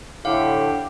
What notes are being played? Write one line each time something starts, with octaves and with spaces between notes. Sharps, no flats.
A2 D3 E4 G4 F5 F#5